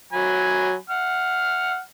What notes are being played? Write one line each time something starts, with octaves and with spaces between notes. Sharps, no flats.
F#3 G#5 B5
F#5 F6